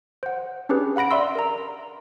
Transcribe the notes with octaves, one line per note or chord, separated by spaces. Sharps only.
C5 F#5
C#4 D4 G4 G#4 B4
F5 F#5 B5 A#6 D7
D5 E5 C6 E6
A#4 A#5